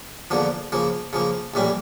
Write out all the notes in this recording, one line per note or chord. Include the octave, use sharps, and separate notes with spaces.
E2 D3 F3 A#3
C#3 F3 A#3
C#3 F3 A#3
A#1 A2 E3 G3 C#4